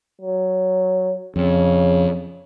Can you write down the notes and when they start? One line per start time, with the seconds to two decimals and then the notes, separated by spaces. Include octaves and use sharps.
0.21 F#3
1.36 F2 C#3